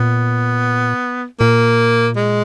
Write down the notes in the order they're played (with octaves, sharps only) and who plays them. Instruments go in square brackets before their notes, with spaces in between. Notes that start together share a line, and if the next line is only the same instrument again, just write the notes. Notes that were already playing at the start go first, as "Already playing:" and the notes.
Already playing: [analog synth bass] A#2 [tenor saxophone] B3
[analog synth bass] A#2 [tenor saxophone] A#3
[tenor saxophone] G#3